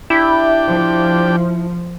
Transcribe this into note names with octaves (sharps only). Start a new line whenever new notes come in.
D4 E4 G4 G5
F3